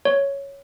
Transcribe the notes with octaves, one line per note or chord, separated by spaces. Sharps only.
C#5